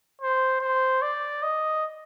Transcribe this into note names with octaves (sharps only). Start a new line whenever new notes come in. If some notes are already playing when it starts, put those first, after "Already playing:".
C5
C5
D5
D#5